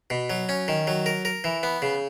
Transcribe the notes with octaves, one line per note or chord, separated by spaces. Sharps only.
B2
F#3
C#4
D#3
F#3
A#4
A#4
E3
B3
C#3